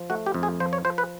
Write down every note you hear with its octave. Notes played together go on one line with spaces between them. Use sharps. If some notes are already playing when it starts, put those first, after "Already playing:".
Already playing: F3
A3 F#4
G4
F2
G#4
F3 C5
C#5
F3 C5
B4